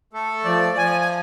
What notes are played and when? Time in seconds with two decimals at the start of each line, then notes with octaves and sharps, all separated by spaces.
0.13 A3 A4
0.45 F3 D5
0.77 F3 G#5
1.01 G#5